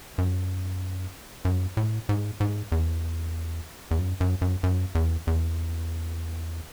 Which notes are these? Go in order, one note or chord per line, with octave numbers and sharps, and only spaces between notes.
F#2
F#2
A2
G#2
G#2
E2
E2
F#2
F#2
F#2
F#2
E2
E2